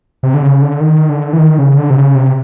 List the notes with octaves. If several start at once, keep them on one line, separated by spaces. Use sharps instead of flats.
C3
D3
C#3
D3
D#3
D3
E3
D#3
C#3
D3
C3
C#3
C3